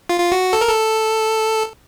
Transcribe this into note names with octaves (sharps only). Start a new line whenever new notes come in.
F4
F4
F#4
A4
A#4
A4